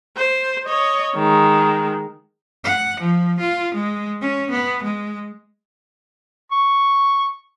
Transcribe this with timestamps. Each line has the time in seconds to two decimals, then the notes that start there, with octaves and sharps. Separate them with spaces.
0.17 C5
0.66 C#5 D#5
1.16 D#3 G#3
2.64 F#5
3.00 F3
3.40 F4
3.74 G#3
4.21 C#4
4.51 B3
4.83 G#3
6.52 C#6